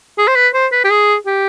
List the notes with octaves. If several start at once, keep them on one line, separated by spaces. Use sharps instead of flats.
G#4
C5
B4
C5
B4
G4
G#4
G4